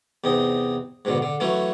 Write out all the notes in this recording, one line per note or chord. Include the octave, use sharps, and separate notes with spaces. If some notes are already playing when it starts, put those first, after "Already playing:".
E2 C3 D#4
G#2 B2 D3
D3
E3 F#3 A3 C#4